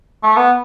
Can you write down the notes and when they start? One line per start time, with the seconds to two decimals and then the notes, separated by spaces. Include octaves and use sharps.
0.24 A3
0.37 B3